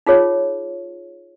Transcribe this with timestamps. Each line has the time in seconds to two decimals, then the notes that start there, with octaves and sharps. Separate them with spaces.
0.06 D#4 F4 G#4 C#5